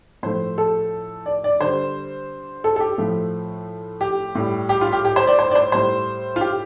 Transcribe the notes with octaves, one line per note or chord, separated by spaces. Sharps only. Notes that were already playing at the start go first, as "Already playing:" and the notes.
A2 F3 A3 C5
A4
D5
D5
D3 G3 C5
A4
A4
G4
A2 F3 A3
G4
A2 G3
G4
F4
G4
G4
C5
D5
C5
D5
C5
A2 G3 C5
F4
G4